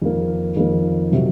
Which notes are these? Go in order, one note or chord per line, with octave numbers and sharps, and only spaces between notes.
F2 D#3 A#3
F2 D#3 A#3
C3 F#3